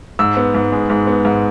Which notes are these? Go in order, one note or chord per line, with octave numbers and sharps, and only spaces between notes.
G#2 E6
B3
G#2
G#3
G#2
B3
G#2